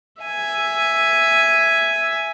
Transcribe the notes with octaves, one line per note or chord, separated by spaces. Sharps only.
E5 G#5